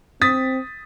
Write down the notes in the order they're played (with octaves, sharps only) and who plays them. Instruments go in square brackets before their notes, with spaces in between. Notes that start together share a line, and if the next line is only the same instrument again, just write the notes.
[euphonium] C4 [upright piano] D#6 A6 B6